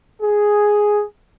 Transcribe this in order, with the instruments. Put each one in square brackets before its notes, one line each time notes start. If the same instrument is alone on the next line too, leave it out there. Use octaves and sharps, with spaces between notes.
[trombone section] G#4